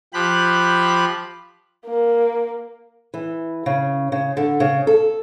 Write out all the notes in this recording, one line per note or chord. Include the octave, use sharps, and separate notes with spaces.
F3 G4 B5 F#6
A#3
E3
C#3
C#3
D3
C#3
A4